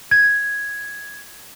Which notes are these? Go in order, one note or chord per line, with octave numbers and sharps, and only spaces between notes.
G#6